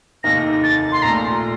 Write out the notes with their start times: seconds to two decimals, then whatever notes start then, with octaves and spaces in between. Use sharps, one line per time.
0.24 F1 D#2 D#3 A#3 D#4 A#6
0.63 A6
0.92 C6
1.02 A#1 A#2 A3 A#5